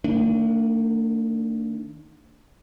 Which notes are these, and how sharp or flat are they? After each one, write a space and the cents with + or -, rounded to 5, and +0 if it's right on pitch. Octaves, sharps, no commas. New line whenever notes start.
D#3 +0 A3 +45 D4 -15